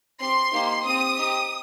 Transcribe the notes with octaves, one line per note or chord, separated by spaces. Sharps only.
C4 G4 C6
A#3 D#4 G4
C4 G4 D#6
C4 D#4 G4